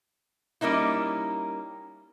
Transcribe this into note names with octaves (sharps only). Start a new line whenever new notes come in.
G3 A#3 C#4 D#4 E4